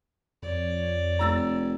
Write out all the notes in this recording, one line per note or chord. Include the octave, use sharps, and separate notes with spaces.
F2 C#5 D5
F1 A#5 E6 A6